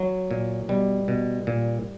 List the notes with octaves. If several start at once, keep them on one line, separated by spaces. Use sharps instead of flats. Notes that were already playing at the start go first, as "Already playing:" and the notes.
Already playing: F#3
A#2
B2 G3
B2
A#2